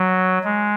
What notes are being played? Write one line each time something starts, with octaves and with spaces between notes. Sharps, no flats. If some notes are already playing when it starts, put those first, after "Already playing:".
Already playing: F#3
G#3